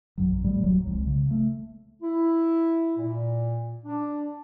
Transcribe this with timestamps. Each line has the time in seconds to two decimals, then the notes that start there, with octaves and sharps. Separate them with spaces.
0.18 A#1 F#2 F#3
0.43 A2 G3 A3
0.62 D#1 F#3
0.87 C2 F3 G#3
1.07 C#3
1.31 A3
2.01 E4
2.97 A#2
3.84 D4